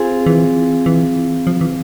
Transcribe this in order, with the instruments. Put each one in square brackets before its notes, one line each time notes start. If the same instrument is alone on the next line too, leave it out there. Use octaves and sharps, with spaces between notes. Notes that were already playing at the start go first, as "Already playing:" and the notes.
Already playing: [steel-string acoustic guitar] C4 F4 G#4
[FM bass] E3
E3
F3
E3